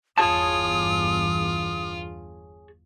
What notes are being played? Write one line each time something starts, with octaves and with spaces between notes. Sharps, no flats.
G1 E2 F4 G#4 C#5 A5 D#6